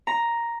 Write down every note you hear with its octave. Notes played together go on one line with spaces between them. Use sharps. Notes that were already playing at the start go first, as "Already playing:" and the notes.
A#5